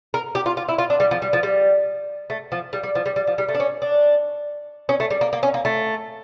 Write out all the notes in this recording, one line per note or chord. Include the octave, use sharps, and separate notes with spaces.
A#4
G4
F4
F4
E4
F4
D4
G3
F3
G3
F3
G3
A3
F3
G3
G3
F3
G3
G3
F3
G3
A3
D4
C#4
D4
C#4
A3
G3
A#3
A#3
C#4
A#3
A3